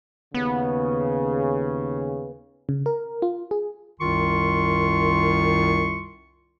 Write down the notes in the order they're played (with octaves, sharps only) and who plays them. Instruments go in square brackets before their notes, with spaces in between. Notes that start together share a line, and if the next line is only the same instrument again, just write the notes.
[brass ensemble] D#2 C#3 [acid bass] B3
[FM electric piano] C#3
A#4
F4
G#4
[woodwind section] C2 F#2 D#3 F4 C6 C#6